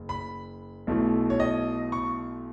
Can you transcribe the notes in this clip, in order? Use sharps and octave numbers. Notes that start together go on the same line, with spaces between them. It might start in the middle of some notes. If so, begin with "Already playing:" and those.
Already playing: F#1
B5
B1 B2 A3 E4
C#5
D#5
C#6